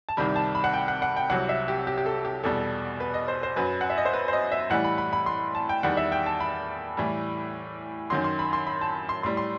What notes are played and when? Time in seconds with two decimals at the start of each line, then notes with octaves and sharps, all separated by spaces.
0.09 A5
0.17 C2 C3 D#3 G3 B5
0.36 A5
0.55 B5
0.64 F#5
0.74 G5
0.88 F#5
1.02 F#5
1.17 G5
1.30 C2 C3 F#3 F#5
1.49 E5
1.68 G4
1.87 G4
1.98 G4
2.06 A4
2.25 G4
2.43 E2 B2 G3 A4
3.00 B4
3.14 D#5
3.28 C5
3.43 C5
3.56 F#2 F#3 B4
3.81 F#5
3.90 E5
3.98 D#5
4.05 C5
4.14 B4
4.28 C5
4.33 D#5
4.52 E5
4.70 A2 E3 G3 F#5
4.84 B5
4.98 B5
5.13 B5
5.26 C6
5.55 A5
5.69 G5
5.83 E2 D#3 G3 F#5
5.97 E5
6.12 G5
6.26 A5
6.40 B5
6.97 A2 E3 G3
8.10 F#2 D#3 F#3 C6
8.24 C6
8.39 B5
8.53 C6
8.67 B5
8.81 A5
9.09 C6
9.23 A2 G3 C6
9.37 C6